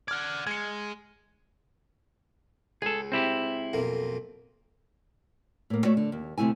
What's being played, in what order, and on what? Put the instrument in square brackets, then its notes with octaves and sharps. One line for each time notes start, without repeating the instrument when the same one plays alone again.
[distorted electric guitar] D5 F#5 [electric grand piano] F6 G#6
[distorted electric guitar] G#3 [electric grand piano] G#6 C#7
[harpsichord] C#2 [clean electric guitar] G#4 A4
[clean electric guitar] C4 E4 G4
[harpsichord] B1 F2 A#3
[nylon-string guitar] A2 A#3
A3 F#4 C#5 D5
D3
D#2
D2 C3 A3 E4 G#5